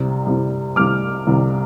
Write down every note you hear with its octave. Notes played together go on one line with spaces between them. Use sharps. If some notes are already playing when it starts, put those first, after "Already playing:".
Already playing: C2 C3 G3
C2 C3 G3
C2 C3 G3 D6 F6
C2 C3 G3